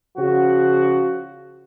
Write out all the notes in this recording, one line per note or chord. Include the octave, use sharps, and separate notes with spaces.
C#3 F3 F#4